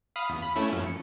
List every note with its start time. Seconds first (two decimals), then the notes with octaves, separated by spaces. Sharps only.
0.16 F5 B5 D#6
0.29 E2
0.42 B5
0.56 A3 C#4 E4
0.73 F#2 F3
0.86 C#7